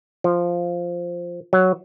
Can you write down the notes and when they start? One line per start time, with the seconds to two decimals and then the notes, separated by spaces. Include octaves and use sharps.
0.24 F3
1.53 F#3